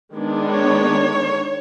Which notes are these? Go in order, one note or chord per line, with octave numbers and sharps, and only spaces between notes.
D#3 G#3 B3 D4
C#5